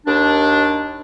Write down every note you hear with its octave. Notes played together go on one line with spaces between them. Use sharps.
D#2 D4